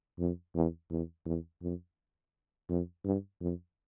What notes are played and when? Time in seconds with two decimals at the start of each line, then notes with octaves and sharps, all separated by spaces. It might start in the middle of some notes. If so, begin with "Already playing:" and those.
0.19 F2
0.55 E2
0.91 E2
1.26 E2
1.62 F2
2.69 F2
3.05 G2
3.41 F2